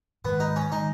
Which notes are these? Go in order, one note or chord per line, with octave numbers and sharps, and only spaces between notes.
G#2 D#3 G#3 B3
D#4
C#4
D#3 G#3 D#4